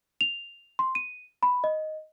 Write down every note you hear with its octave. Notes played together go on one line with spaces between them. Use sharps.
F7
C6
D#7
B5
D#5